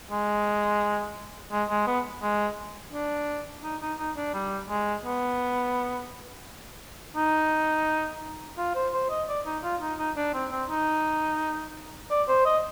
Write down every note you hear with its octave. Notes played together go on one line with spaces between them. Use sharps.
G#3
G#3
G#3
B3
G#3
D4
D#4
D#4
D#4
D4
G3
G#3
B3
D#4
F4
C5
C5
D#5
D5
D#4
F4
D#4
D#4
D4
C4
C4
D#4
D5
C5
D#5